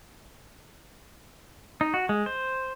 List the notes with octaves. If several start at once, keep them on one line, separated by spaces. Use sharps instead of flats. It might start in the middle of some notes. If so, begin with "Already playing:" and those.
D#4
F#4
G#3
C5